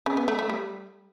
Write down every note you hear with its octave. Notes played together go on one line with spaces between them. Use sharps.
C#3
B3
A3
A3
G3